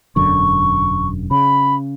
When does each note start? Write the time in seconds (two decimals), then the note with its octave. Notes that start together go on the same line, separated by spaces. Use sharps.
0.16 E1 F#2 D3 C#6
1.31 C#3 B5